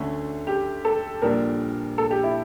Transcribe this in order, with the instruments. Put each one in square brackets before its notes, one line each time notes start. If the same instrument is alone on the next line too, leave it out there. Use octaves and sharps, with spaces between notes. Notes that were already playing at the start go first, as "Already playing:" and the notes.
Already playing: [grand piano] D2 D3 A3 C#4
[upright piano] G4
A4
[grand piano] A#1 A#2 G3 D4 [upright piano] A#4
[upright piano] A4
G4
E4